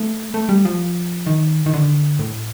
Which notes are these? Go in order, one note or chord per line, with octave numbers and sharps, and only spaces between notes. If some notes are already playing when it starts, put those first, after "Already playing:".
Already playing: A3
A3
G3
F3
D#3
D#3
D3
A2